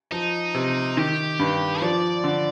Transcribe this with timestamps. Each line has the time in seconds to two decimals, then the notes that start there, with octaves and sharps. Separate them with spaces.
0.12 F3 D#4
0.55 C3
0.97 D#3 G4
1.39 G2
1.82 F3 D5
2.24 D3